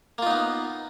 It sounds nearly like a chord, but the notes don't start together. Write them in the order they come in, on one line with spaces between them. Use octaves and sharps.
A#3 F4 D#4 B3